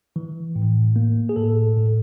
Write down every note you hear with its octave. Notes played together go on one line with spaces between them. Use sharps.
E3
A2
A#3
G#4
A2 A4
A2